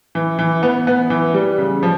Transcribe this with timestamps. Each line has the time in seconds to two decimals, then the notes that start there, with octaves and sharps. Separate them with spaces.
0.15 E3
0.39 E3
0.63 B3
0.87 B3
1.10 E3
1.34 G3
1.58 C#3
1.83 F3